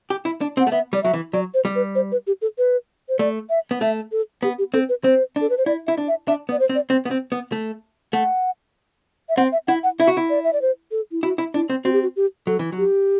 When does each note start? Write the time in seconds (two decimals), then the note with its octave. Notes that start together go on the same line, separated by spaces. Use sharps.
0.10 G4
0.25 E4
0.41 D4
0.57 C4
0.60 F#5
0.67 A3
0.71 B3 E5
0.93 G3 D5
1.03 F#3 E5
1.13 E3
1.33 F#3 D5
1.54 C5
1.65 G3
1.75 B4
1.95 C5
2.12 B4
2.27 G4
2.42 A4
2.58 B4
3.09 C5
3.19 A3 D5
3.50 E5
3.71 B3
3.81 A3 E5
4.12 A4
4.43 B3 G4
4.58 G4
4.74 C4 A4
4.89 B4
5.04 C4 C5
5.36 D4
5.41 A4
5.50 B4
5.58 C5
5.66 E4 D5
5.87 E4 E5
5.98 D4
6.08 E5
6.28 D4 E5
6.49 B3
6.52 D5
6.60 C5
6.69 C4
6.75 D5
6.90 C4
7.05 B3
7.11 C4
7.32 B3
7.52 A3
8.13 A3 F#5
9.29 E5
9.37 C4 F#5
9.52 E5
9.68 E4 F#5
9.83 F#5
10.00 E4 E5
10.07 F#4
10.17 E4
10.30 D5
10.44 E5
10.53 D5
10.62 C5
10.91 A4
11.12 E4
11.23 E4 F#4
11.38 E4
11.54 D4 E4
11.70 C4
11.85 C4 F#4
11.93 G4
12.02 F#4
12.16 G4
12.47 F#3 A4
12.59 E3
12.72 F#3
12.78 G4